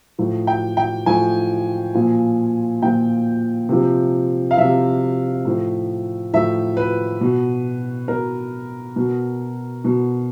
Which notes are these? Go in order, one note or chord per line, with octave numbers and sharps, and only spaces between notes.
A2 F3
G5
G5
A2 F3 G#5
A#2 F3
A#2 F3 G5
C3 F3
F5
C3 F3 E5
A2 F3
A2 F3 E5
B4
B2
B2 A#4
B2
B2